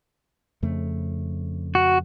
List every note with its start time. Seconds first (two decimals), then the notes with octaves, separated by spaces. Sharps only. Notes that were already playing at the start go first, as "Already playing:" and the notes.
0.63 F2 C#3 A3
1.75 F#4